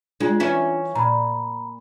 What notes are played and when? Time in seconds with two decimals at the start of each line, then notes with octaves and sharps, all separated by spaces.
0.20 G#3 D4 F4
0.40 E3 C#4 E5
0.95 A#2 A#5 B5